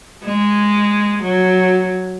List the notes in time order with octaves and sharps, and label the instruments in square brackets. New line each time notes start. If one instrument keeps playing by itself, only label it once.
[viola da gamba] G#3
F#3